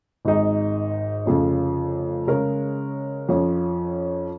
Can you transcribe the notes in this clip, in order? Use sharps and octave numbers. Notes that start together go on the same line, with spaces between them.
G#1 G#2 G#3 D#4 G#4
F1 F2 C#3 F3 C#4
C#3 G#3 C#4 A#4 C#5
F2 F3 C#4